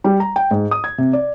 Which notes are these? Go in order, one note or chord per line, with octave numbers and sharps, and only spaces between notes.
G3
A#5
G5
G#2
D#6
G#6
C3
D5